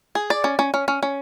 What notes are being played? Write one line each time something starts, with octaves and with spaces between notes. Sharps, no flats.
G#4
D5
C#4
C#4
C#4
C#4
C#4